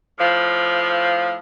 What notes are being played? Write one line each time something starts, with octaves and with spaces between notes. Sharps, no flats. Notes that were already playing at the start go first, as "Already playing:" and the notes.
A2 F3